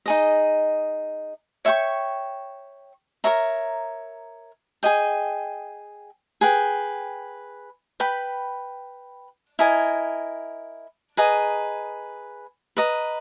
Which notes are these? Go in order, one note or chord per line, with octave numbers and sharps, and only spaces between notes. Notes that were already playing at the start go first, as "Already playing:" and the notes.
D#4 G#4 D#5
C#5 E5 G5 C#6
A#4 C#5 E5 A#5
G#4 D#5 G5
G#4 B4 G5
B4 G5 B5
E4 A#4 D#5 G#5
G#4 B4 D#5 A#5
B4 D#5 A#5